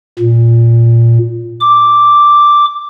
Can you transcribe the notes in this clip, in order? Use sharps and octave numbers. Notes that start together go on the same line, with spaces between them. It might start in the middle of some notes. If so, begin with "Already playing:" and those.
A#2
D6